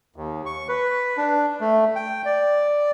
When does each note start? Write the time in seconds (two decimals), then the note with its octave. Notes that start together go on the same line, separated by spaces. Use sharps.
0.16 D#2
0.46 C#6
0.68 B4
1.17 D4
1.61 A3
1.96 G5
2.25 D5